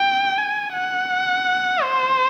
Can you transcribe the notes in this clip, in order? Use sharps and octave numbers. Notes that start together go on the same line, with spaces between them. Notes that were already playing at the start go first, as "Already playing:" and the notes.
Already playing: G5
G#5
F#5
C5